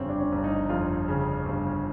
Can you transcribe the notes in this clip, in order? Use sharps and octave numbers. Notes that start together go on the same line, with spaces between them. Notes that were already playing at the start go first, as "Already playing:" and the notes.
Already playing: G1 F2 C#3 C4 C#4
D4
C#4
G1
D#4
F2 F4
C#3
G1